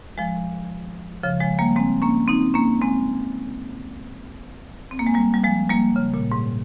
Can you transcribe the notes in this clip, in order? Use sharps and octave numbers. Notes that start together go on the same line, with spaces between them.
F3 G#3
C#3 F3
F3 G#3
G3 A#3
G#3 C4
A#3 C#4
C4 D#4
A#3 C#4
G#3 C4
C4
A#3
G#3
G3 A#3
G3
F3 G#3
G3 A#3
C#3
A#2
G#2